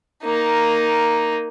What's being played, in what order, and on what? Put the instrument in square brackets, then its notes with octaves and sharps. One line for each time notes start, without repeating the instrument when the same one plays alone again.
[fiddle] A#3 D#4